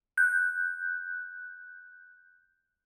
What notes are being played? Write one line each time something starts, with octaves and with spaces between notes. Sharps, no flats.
F#6 G6